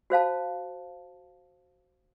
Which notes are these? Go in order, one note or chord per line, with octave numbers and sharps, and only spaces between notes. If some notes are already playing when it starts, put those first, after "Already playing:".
F#4 C5 F5 A5